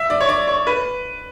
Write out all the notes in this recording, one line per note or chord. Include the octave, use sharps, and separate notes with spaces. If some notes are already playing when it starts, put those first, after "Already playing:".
Already playing: E5
D5
C#5
D5
C#5
B4